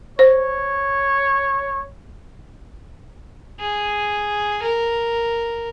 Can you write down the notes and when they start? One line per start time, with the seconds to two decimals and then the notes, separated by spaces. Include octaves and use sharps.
0.19 C5 C#5
3.60 G#4
4.62 A#4